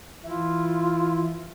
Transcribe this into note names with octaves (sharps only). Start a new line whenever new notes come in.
E3 E4 F4